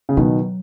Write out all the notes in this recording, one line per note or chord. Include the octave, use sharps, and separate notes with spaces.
C#3
B2 D#3 F#3